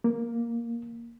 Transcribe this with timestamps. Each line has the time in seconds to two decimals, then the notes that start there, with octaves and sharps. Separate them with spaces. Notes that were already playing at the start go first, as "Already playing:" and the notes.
0.04 A#3